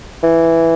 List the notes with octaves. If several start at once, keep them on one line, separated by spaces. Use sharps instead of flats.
E3